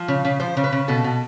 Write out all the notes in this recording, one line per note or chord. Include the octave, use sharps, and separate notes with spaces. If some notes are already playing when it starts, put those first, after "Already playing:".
Already playing: F3
C#3
C#3
F3 C5
C#3
B4
C#3
B2 A4
B2